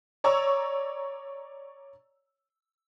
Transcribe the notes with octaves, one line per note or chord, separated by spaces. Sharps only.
C#5 D5 A#5 C#6 E6